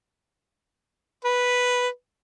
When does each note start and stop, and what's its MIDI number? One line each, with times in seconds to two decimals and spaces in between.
1.25 1.87 71